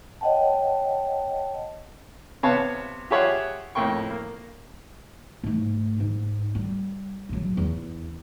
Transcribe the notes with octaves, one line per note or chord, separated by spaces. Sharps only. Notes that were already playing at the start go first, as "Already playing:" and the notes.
C#5 D#5 F#5 G5 A5
C3 B3 C#5 F5 A5
F4 G4 G#4 C#5 E5 F#5
F2 A2 A#3 G5 C#6
A#3
G#2 A3
G#2
G3
A#1 F#3
E2